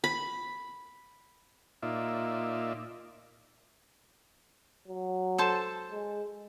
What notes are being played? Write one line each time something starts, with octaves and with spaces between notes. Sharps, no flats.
B5
A#2 D#4 F4 D5 E5
F#3
A4 C5 A5
G#3